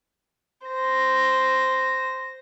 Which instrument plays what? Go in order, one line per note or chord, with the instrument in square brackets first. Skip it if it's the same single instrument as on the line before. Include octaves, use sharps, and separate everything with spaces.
[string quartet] C5 A#6